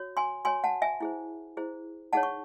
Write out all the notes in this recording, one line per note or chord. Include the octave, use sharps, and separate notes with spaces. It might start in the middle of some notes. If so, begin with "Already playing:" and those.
Already playing: F#4 C#5
G#5 C6
F#4 C#5 G#5 C6
F#5 A5
E5 G#5
E4 G#4 C5
E4 G#4 C5
D#4 G#4 C#5 F#5 A5
C#6